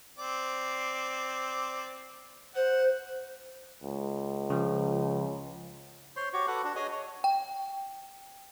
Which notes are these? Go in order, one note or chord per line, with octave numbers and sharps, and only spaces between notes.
C4 D5
C5 F#5
C#2
C#3 F3
C5 C#5 C6
F#4 G4 C#5 C#6
F#4 A4 B4 F#5
D4 F#4
G#4 C#5 D#5 G#5
C#5
G5